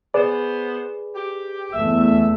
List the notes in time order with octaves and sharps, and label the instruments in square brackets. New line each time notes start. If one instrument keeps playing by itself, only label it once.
[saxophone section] B3 C5 [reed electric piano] G#4 B4 D5
[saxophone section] G4
[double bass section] E2 E3 A3 [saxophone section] E5